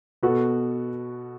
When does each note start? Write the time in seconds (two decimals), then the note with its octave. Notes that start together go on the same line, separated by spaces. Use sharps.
0.23 B2 B3 F#4 A4